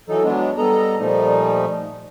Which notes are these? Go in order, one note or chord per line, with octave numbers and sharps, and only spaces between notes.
E3 F#3 D#4 A4
F#3 G#3 B3 D4
G3 B3 A4 D#5 A#5
A#2 F3 G3 A3 D#4